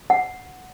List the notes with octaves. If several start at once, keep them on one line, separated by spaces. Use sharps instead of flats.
F#5